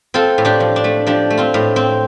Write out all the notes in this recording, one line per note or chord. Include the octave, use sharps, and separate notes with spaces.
C4 F4 A4
A2
D4 G4
F3
D4
A3
F3 D4 G4
A3
C4 F4
A2
C4